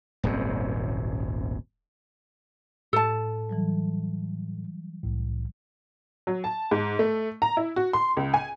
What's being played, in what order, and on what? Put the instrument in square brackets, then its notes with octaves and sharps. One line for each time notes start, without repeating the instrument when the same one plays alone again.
[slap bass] D#1 G#1 F#2 C3
[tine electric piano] A2 [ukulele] A4 A5
[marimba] E3 F#3 G3
[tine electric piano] C2 A2
[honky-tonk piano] F#3
A5
G#2
A3
A#5
E4
F#4
C6
C#2
G#5